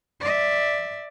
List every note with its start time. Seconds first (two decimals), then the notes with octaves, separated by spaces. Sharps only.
0.20 D5 E5